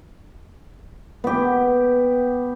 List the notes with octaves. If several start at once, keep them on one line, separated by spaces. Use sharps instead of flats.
B3 G4